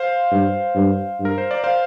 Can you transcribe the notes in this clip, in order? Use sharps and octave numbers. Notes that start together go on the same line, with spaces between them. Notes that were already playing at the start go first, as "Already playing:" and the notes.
Already playing: C5 F5
G2
G2
G2
A#4
C5
D5
C5 F5